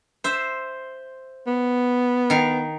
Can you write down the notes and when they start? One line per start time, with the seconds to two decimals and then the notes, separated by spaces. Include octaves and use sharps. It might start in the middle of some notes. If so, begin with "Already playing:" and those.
0.24 C5 E5
1.47 B3
2.30 D#3 F5